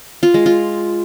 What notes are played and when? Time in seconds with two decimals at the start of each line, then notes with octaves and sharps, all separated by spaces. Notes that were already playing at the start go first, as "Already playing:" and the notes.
0.23 F4
0.34 G#3
0.46 F4